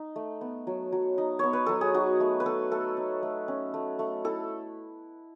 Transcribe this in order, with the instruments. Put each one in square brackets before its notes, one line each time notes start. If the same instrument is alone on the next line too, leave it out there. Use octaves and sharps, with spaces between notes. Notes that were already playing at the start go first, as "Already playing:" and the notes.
Already playing: [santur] D#4
A3
B3
F#3
F#3
D#4
B3 C#5
B4
F#3 A4
G#4
D#4 F#4
A3
B4
D#4 A4
A3 A4
D#4
A3
C#4
A3
A3
E4 A4